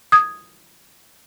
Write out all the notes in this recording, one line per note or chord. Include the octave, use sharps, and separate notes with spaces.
D#6 G#6